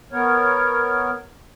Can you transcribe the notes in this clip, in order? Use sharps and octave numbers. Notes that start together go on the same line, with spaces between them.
B3 A#4 C#5